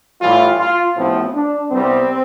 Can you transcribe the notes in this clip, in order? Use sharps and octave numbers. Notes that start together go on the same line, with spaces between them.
A2 E3 G3 F4
F4
A1 A2 F3 B3 C4
D4
C2 C3 G3 B3 C4